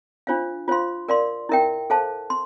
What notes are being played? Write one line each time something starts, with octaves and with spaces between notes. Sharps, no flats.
D4 F4 C5 F5
F4 C5 F5 C6
A#4 D5 F5 C6
E4 A#4 E5 G5
A4 C5 F5 A5
C6